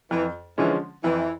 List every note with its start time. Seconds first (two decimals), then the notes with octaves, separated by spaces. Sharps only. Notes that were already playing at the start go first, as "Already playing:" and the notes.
0.11 F2 E3
0.58 D3 E3 F3 G#3 C#4
1.04 F2 E3